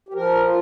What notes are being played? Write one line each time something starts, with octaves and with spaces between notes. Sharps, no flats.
G4
F3 A#4
F4